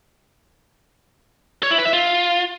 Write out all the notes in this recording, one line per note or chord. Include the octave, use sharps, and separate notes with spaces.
C#5
E4
B4
E5
F4